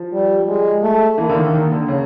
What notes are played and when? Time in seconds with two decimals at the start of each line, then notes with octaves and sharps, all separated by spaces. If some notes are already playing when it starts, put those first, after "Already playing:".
Already playing: F3
0.13 G3
0.48 G#3
0.83 A3
1.18 E3 A#3
1.29 D3
1.36 D#3
1.54 D#3
1.72 D3
1.88 C#3